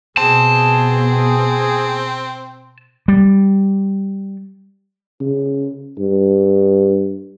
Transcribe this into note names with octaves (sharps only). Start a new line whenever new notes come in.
B2 B3 C4 G#4 A5
G3
C#3
G2